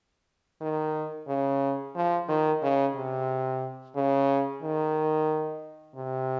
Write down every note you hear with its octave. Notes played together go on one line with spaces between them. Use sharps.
D#3
C#3
F3
D#3
C#3
C3
C#3
D#3
C3